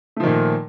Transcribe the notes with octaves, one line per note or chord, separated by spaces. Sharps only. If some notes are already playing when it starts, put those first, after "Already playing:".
A#2 D#3 F3 A3